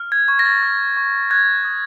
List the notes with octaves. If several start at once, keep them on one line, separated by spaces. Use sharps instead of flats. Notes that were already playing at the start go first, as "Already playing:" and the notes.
Already playing: F6
G#6
C#6 G#6
A#6
A6
F6
C#6
F#6 G#6
D#6